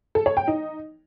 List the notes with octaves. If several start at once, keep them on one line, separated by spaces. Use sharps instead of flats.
A4
C#5
G5
D#4